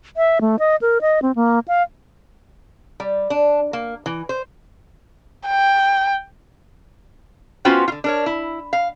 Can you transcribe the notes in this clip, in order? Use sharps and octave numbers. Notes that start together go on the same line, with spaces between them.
E5
A3
D#5
A#4
D#5
C4
A#3
F5
G3
D4
A#3
E3
C5
G5
B3 C#4 F4 F#4 C5 G5
D3 F4
D4 A#4 C#5
E4
F5